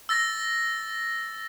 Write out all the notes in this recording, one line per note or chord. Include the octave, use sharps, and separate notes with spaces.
E6 A6 A#6